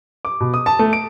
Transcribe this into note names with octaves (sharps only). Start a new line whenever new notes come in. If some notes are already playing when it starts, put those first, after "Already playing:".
D6
B2
D#6
A5
A3
D7